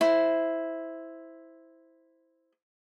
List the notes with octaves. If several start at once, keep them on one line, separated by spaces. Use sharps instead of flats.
E4 C5